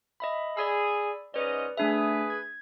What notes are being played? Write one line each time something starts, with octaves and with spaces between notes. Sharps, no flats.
D#5 E5 B5
G#4 D5 B5 E6
G#2 C#4 B4 D5 D#5
A3 D4 G#4 B4 E5
G#6